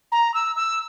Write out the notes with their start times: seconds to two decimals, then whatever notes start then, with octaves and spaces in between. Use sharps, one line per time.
0.12 A#5
0.34 E6
0.56 E6